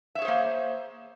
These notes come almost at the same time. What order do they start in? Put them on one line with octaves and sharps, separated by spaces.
E5 C#5 G#4 C5 A#3